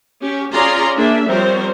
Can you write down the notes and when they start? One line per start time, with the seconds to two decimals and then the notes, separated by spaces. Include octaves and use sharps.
0.21 C#4 G4
0.52 C#4 F4 G#4 D5 A#5 C6
0.96 A#3 D4 G#4 E5
1.27 F3 G3 C4 A#4 C5 C#5